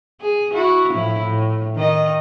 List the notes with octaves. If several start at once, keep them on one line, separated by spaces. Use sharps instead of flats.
G#4
E4 F#4
A2 F3 E4
A2
D#3 D#5